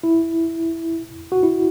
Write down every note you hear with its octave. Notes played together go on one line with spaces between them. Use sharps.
E4
F#4
E4